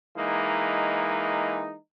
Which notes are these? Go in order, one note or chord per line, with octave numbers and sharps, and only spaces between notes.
E3 G#3 A#3 D#4